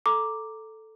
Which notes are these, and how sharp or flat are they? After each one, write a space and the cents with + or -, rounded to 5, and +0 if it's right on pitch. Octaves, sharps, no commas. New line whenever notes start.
A4 +0 A#5 +0 D6 +0